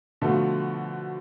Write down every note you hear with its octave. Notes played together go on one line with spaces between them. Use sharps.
B2 D3 F3 A3